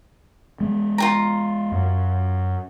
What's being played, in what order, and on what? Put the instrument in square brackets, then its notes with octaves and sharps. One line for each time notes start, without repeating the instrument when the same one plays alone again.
[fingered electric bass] G#3 B3
[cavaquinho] F4 G#4 A#5
[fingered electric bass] F#2